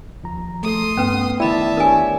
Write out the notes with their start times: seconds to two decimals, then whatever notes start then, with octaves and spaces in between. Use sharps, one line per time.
0.23 D#2 F3 A#5
0.63 A3 A4 C6 D#6
0.97 G2 B3 C#4 B4 G5
1.40 D#3 E4 D5 E5 G5 A5 B5
1.77 D4 G4 A#4 C#5 G#5